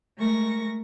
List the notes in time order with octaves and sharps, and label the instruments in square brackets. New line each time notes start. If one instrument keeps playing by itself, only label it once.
[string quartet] G#3 A3 A#4 C#6 A#6